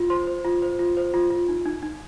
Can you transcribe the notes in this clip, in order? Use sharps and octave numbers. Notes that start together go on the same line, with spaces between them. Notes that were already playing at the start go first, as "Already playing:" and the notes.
Already playing: F4
C5 C6
C5
F4
C5
F4
C5
F4
F4
D#4
D#4
D#4